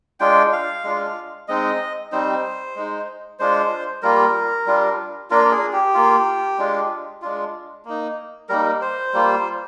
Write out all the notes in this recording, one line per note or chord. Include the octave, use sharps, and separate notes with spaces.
G#3 D4 F4 G5
F5
G#3 D4 F4
G#3 C4 D#4 D#5
G3 C4 D#4 C5
G#3 D#4
G#3 D4 F4 C5
G3 A#3 F4 A#4
G3 D4 F4
A#3 D4 F4 A#4
A#4
G#4
G4
A#3 F4
G#3 D4 F4
G#3 D4 F4
A#3 D#4
G3 A#3 D#4 A#4
C5
G3 A#3 F4